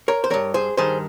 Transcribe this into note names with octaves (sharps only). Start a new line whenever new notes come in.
A#4 C#5
C5
G2 D#3 A#4 C#5
G#4 C5
G2 D#3 G#4 C5